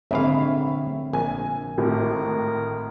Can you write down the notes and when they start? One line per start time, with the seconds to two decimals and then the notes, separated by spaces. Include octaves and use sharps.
0.11 A#1 G#2 D3 C4 C#5 E5 F5 B5
1.13 A#1 G#5
1.78 G#1 A2 A#4